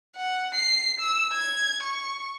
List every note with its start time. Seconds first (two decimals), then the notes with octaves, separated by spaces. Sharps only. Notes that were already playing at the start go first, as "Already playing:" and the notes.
0.16 F#5
0.55 C7
1.00 E6
1.33 G#6
1.83 C#6